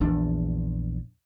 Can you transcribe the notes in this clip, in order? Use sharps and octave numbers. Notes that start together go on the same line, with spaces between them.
A#1 E2 D4